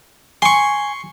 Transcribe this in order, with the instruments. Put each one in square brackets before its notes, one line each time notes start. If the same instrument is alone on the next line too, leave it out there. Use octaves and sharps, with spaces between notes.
[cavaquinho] G#5 [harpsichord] C6 C#6